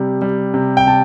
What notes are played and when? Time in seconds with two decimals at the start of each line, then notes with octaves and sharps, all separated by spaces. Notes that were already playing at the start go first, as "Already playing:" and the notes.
Already playing: C3 G3
0.22 G3
0.54 C3
0.77 G5
0.87 C3 A5